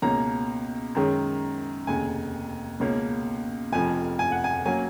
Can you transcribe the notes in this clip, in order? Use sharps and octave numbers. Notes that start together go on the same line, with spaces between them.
C#2 B2 A#3 C#4 A#5
F#2 D#3 G#3 C#4
F1 D#2 C#3 G#5
C#2 B2 A#3 C#4
F1 F2 F3 G#5
G#5
F#5
G#5
F#3 A#3 C#4 G#5